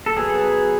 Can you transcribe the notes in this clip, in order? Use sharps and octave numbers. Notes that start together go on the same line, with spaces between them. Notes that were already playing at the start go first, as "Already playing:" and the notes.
A4
F#3 B3 G#4